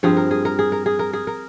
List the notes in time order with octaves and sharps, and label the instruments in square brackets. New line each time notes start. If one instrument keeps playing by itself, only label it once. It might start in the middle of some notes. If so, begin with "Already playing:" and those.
[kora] G2 F3 C4 G#4
A#4
G#4
A#4
G#4
A#4
G#4
A#4
G#4
A#4